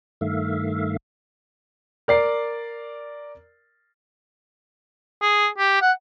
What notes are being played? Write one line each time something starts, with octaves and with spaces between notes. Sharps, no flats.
G2 D#3 A3 E5 F5
A#4 D5 C7
G#4
G4
F#5